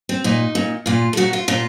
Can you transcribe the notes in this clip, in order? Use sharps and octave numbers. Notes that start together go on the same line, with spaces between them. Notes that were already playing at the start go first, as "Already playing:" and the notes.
C4
A#2 D#4
A#2
A#2 F4
A4
A#2 F#4
F4
A#2 F4